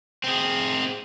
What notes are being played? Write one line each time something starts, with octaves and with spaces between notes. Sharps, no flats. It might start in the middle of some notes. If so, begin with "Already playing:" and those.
C4 G#4